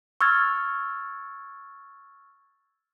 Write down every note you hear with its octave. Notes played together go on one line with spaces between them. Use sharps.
C#6 E6 F6 G#6 A6